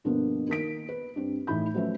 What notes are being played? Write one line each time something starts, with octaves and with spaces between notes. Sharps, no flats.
G2 B2 D3 F3 A#3 B3
D#3 A#3 B6 D7
B4
G2 C4
A2 E3 D#4 B5 G6
F3 F#3 A3 C#4 B4 E5